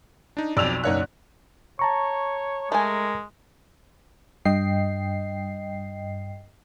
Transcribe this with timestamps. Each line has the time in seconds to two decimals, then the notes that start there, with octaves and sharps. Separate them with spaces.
0.37 D4 D#4
0.57 B1 F2 D5 E6 F7
0.84 F#1 D#4 C#5 D5 F#5 F#6
1.79 C#5 A5 A#5 C#6
2.72 G#3 A3 A#4 G#5
4.45 G2 D#5 G5 C7